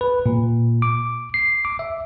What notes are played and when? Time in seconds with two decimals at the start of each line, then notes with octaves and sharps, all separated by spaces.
0.01 B4
0.26 A#2
0.82 D6
1.34 C7
1.65 D6
1.79 E5